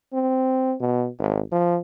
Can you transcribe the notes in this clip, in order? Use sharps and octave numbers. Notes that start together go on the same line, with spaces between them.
C4
B2
G#1
F3